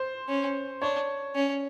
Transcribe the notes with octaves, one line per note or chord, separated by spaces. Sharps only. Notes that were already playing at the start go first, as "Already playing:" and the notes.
Already playing: C5
C#4
D4 C#5
C#4